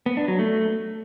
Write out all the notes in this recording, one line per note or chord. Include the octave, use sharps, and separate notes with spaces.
B3
D4
F#3
A3